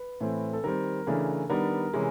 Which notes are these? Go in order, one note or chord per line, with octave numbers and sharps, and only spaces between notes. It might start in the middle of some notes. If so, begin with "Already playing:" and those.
Already playing: B4
A2 E3 A3 C4
A4
D#3 G3 C4 A#4
C#3 E3 A3 D4
D#3 G3 B3 D4 A#4
C3 E3 G#3 C#4